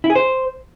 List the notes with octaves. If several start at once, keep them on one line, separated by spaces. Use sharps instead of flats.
E4
G#4
C5